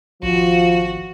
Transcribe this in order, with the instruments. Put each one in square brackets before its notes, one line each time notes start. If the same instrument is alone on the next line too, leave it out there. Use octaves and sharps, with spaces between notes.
[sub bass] G#1 [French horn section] F3 [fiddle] F#4